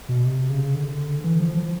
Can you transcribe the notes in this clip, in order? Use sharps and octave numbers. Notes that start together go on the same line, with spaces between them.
B2
C3
C#3
D3
E3
F3
F3